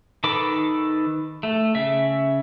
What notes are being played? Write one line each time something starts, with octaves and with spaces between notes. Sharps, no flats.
D#3 A4 B4 D6
A3
C#3 E5